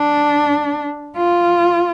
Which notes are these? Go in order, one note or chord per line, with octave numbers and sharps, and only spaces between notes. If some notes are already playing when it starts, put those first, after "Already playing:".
Already playing: D4
F4